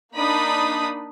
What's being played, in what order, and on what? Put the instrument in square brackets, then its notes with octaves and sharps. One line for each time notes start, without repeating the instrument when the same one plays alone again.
[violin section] A#3 D4 D#4 B5 D#6